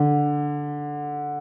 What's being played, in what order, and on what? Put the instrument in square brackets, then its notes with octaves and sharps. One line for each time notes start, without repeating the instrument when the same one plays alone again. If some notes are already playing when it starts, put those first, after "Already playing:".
Already playing: [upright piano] D3